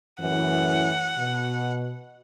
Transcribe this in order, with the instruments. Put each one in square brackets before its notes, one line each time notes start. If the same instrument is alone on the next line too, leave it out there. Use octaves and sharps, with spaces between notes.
[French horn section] F#2 A2 E3 [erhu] F#5
[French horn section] B2